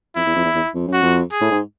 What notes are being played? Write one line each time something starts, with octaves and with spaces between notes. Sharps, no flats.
F2 E4
E2
F2
E2
E2
F2
F#2
F#4
F2
G#4
A2
G#2